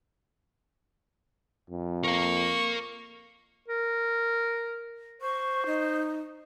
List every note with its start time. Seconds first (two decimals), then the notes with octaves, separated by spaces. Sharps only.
1.70 F2
2.04 A#4 F5 C#6
3.68 A#4
5.21 C5 C#6
5.66 D#4